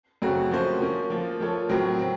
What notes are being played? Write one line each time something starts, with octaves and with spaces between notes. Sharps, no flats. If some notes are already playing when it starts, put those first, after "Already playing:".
F#2 C#3 A3 C4 F#4
F3 A#3 C#4 F#4 C5
F3 A#3 C#4
F3 A#3 F4
F3 A#3 F4 A4 C#5
A2 F#3 C4 F#4 A#4
F#3 C4